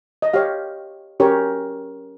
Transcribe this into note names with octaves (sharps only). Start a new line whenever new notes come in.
D#5
G4 C#5 F5
C#4 G4 A#4 C#5